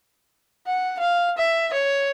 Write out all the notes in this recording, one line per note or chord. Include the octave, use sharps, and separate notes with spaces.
F#5
F5
E5
C#5